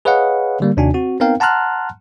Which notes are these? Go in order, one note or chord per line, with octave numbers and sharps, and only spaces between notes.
G#4 B4 C#5 D#5 F5 F#5
D3 G3 A#3
D#2 C3 D4 D#4 F#4 G#5
C4 F#4
B3 C4 D#4 A#4 F5 G5
F#5 A5 A#5 C6 F6 F#6